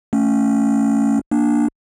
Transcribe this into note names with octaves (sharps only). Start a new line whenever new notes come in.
A3 C#4
A#3 D4